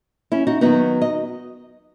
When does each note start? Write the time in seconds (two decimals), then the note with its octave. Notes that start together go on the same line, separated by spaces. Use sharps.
0.32 C#4 E4
0.47 D#4 F#4
0.61 D#3 F#3 B3 D#4 F#4
1.02 D#5